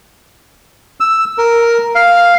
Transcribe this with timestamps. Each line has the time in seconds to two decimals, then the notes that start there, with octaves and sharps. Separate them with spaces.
1.00 E6
1.38 A#4
1.95 F5